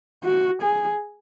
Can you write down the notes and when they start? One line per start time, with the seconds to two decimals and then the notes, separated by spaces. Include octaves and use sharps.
0.24 F#4
0.62 G#4